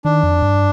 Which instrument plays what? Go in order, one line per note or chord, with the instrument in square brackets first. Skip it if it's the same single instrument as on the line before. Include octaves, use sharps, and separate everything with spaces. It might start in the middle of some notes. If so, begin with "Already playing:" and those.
[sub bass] D#3 [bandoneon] D4
[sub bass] F2
G2